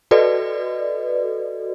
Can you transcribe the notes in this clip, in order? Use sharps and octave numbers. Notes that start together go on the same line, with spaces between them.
F#4 A4 B4 D5 D#5